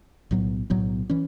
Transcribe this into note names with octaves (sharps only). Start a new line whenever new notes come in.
B1 A2 F#3 B3
B1 A2 F#3 B3
E3 C#4